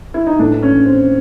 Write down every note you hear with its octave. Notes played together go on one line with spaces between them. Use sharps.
E4
D#4
A2 E3 D4
C#4
C4